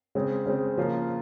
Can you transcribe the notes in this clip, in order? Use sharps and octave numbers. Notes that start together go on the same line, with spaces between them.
C#3 G#3 C4
C#3 G#3 C4
C#3 F3 A#3 F4